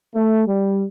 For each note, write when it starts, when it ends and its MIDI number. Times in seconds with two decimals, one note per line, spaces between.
0.15 0.43 57
0.47 0.84 55